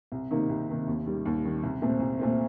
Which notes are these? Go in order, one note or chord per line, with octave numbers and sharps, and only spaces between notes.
C2
C3 D#3 A#3 D#4
C2
C3 D#3 A#3 D#4
D#2
D#3 G3
D#2
D#3 G3
C2
A#2 A3 C4
C2
A#2 A3 C4